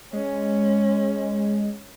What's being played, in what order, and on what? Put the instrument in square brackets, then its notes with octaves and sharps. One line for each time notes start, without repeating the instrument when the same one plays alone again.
[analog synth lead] G#3 [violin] C#4